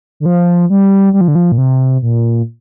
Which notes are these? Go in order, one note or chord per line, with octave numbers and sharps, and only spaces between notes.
D3
F3
G3
G3
F3
D3
F3
A#2
C3
A#2